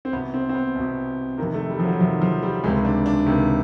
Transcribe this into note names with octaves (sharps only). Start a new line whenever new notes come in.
C4
C2 B2 B3
C4
C4
B3
C2 B2
F2 C3 D#3 A#3
A3
G3
F3
F#3
F2 C3 D#3 F3
F3
G3
C#2 C3 D#3 G#3
D4
D4
C#2 C3 D#3